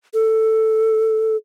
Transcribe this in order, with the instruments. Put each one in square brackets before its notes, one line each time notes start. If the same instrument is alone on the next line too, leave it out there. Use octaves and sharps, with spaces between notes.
[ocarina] A4